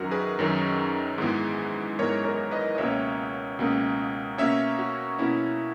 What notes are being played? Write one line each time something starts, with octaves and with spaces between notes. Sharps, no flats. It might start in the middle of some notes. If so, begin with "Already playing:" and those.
Already playing: F#2 D#3 F#3 C#4 F#4 A#4
G#4 B4
F#2 D#3 F#3 C#4
G#2 E3 G#3 B3
G#2 E3 G#3 B3 A#4 C#5
A#4 C#5
B4 D#5
D#5
C#2 B2 A#3 C#4 C#5 E5
C#2 B2 A#3 C#4
B2 A#3 C#4 C#5 E5
F#4
B2 A#3 C#4 E4